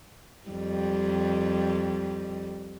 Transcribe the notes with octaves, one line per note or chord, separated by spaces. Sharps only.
F2 G3